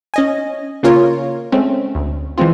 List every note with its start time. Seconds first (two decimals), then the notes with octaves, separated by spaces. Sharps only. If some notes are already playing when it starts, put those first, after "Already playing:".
0.14 C#4 D#5 G#5
0.83 C#3 A#3 C#4 F4 A#4 C#5
1.52 G#3 A3 C4 C#4
1.95 D2
2.38 E3 F3 G#3 C4 F4